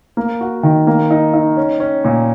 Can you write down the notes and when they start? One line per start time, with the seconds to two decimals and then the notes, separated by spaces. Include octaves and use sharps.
0.17 A#3
0.41 F#4
0.63 D#3
0.87 A#3
1.11 D#4
1.34 D#4
1.57 C#4
1.80 C#4
2.05 A#2